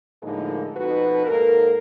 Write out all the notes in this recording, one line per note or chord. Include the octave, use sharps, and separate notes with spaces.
A2 D3 F3 G#3 A#3 D#4
F2 B2 D#4 F#4 B4
G#2 A#3 A4 A#4